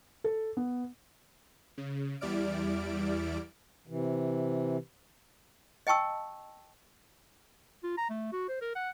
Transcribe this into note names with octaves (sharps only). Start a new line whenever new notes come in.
A4
B3
C#3
E2 G3 E4 D5 F6 D7
C3 E3
D#5 G5 A5 C#6 E6
F4
A#5
A3
F#4
C5
A#4
F#5